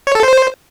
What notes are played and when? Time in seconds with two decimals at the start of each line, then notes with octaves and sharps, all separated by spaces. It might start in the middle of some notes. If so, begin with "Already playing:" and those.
0.07 C#5
0.15 A4
0.23 C5